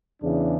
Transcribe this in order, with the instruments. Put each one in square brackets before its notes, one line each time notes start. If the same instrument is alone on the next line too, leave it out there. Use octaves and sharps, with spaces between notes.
[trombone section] E2 C#3 E3 D4